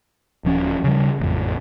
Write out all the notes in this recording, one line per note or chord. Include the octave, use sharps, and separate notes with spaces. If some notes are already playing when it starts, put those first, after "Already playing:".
D#1 F3 C#4
C#3 G3
A1 F2